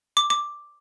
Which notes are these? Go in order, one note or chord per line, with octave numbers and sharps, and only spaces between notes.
D6
D6